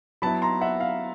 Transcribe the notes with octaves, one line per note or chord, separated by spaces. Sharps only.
F#3 B3 E4 A5 B5
A#5 C6
E5 F#5
F5